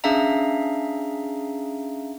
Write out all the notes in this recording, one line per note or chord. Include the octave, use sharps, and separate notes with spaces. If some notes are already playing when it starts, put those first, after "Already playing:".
C#4 D4 G#4 E5 F5 A#5